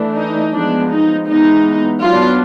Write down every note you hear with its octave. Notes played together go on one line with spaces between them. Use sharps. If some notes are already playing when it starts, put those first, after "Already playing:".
Already playing: E3 A3 D4
D#4
F3 G#3 B3 D4
D#4
E3 G#3 B3 D#4
F#3 B3 D4 F4